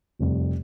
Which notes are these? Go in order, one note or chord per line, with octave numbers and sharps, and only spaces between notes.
F1 F2 C3 G3